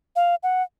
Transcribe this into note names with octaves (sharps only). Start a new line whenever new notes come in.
F5
F#5